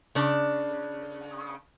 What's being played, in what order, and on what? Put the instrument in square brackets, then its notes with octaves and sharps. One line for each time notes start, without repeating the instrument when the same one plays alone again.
[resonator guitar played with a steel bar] C#3 D4